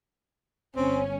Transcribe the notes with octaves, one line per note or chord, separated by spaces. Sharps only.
G1 C4 C#4